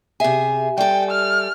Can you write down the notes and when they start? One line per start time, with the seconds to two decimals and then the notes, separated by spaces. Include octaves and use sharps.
0.20 C3 G#4 E5 G#5
0.78 G3 A4 G5
1.11 F6